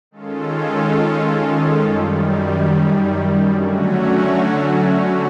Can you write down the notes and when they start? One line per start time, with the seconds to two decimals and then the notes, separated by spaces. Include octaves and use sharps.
0.11 D#3 G#3 C#4 F4 A4
1.81 F#2 D#3 G3
3.50 D3 F#3 A3 C#4 F#4